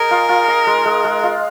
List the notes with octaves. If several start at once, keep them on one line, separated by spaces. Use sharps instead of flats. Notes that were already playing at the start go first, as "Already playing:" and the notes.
Already playing: D#4 G#4 A#4 D#5
F4
F4
D#5
G#3
G#3
G#3
F4